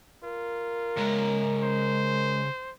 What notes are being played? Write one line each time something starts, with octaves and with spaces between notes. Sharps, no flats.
F4 A#4
C#3 G#3 C#5 A#5
C5